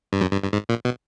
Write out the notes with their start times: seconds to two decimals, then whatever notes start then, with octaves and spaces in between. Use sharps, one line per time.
0.13 G2
0.21 F#2
0.32 G2
0.43 G2
0.53 G#2
0.69 A#2
0.85 B2